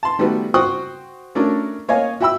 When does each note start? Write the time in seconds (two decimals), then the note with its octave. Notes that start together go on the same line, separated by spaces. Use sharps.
0.03 A5 C6
0.19 D#3 G3 A3 B3 F#4
0.54 F#4 C5 G5 C#6 D#6 F#6
1.35 A3 C#4 D4 F#4 A#4
1.88 A#3 C#5 D#5 F5 G#5
2.20 F#4 E5 G5 B5 E6